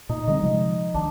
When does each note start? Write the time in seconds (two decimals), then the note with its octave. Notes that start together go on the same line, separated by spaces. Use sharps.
0.09 A#2 D#4
0.27 D3 G3 C4 D#5
0.43 C3 F3 G#3
0.94 A#1 D#3 D4